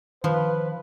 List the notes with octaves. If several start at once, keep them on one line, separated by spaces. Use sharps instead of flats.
D#3 F3 B4